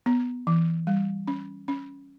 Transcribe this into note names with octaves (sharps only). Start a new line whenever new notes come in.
B3
E3
G3
C#4
C#4